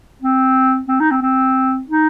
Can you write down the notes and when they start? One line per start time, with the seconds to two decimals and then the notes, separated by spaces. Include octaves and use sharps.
0.22 C4
0.88 C4
1.00 D#4
1.11 C4
1.22 C4
1.88 D#4